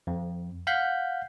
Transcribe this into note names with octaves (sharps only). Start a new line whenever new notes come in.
F2
F5 F#5 F#6 G6 B6